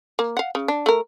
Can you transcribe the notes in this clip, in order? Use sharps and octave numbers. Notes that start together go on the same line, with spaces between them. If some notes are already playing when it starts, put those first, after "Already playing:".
A#3
F5 F#5
C#3
D4
A3 A#4